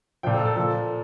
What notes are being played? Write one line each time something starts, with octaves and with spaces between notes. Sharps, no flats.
A#2 F3 G5
A4
A4
A#2 F3 A4